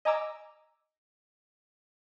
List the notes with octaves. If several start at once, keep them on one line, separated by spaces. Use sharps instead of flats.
D#5 G#5 A#5 D6 E6